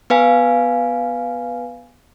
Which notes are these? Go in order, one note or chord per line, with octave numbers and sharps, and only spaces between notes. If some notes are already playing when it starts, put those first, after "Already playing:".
B3 B4 F5 G#5